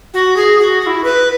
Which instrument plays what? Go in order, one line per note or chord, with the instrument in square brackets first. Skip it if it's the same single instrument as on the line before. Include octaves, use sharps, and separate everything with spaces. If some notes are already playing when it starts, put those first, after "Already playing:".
[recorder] F#4
G#4
F#4
F#4
E4
B4